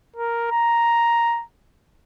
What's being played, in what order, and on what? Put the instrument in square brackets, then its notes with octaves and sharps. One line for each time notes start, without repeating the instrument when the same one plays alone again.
[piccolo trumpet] A#4
A#5